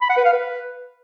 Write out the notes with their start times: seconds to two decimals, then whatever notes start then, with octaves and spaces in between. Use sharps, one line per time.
0.02 B5
0.09 F#5
0.17 B4
0.25 F5
0.33 B4